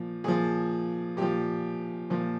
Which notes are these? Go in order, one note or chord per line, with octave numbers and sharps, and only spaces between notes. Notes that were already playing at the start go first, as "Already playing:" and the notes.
Already playing: A#2 F3
A#2 F3 G#4
A#2 F3 G4
A#2 F3